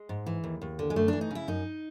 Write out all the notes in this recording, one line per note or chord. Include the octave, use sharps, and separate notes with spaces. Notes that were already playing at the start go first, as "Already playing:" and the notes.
Already playing: G#3
G#2
E3
D#2
D#2
D3
G#3
F#2 A3
E3 D4
D#4
C#3 E4
F#2 D#4